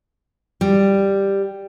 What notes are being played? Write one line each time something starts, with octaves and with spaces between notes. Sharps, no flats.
G3